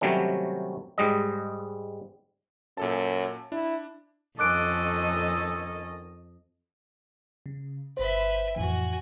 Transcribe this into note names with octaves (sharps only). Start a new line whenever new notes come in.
C3 D#3 F#3 G3 A3 C#4
G#2 G3 G#3 D#5
F#2 A#2 A4 A5
D4 E4
F2 D#3 C#4 A4 D#5 D6 F#6 D7
C#3
G1 B4 C5 E5
F2 A2 E3 F#4 G#5